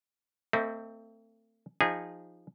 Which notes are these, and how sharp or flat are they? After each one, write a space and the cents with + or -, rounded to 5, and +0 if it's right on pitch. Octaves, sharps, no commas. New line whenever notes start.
A3 +40 C4 +0 D#5 +45
F3 +0 D#4 +0 G#4 -25